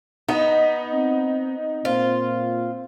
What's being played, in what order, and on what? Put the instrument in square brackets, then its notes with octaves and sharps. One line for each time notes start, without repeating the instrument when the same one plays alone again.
[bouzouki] B3 [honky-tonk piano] D#4 [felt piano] D#5
[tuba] C4
[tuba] A#2 [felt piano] C4 [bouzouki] F4